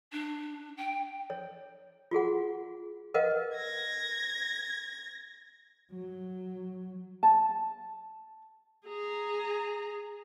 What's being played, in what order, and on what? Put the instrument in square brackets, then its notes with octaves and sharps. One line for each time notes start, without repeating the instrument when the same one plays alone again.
[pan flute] D4
G5
[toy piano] C#5
F4 F#4 G#4 F#5
A#4 B4 D#5 F5 F#5
[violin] G#6 A#6
[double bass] F#3
[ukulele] A5
[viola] G#4 A#5